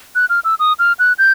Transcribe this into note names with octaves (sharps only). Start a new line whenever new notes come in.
F#6
F6
E6
D#6
F6
F#6
G6